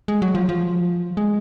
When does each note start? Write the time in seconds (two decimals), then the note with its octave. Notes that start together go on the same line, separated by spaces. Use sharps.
0.08 G#3
0.22 F#3
0.35 F3
0.49 F3
1.17 G#3